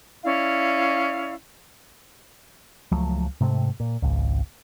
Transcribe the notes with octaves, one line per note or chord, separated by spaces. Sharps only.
C#4 E4 D5 F5
C#2 F3 F#3 A3
G#2 C3 A3 C4
A#2
G#1 C#2